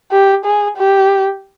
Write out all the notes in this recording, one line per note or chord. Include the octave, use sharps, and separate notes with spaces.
G4
G#4
G4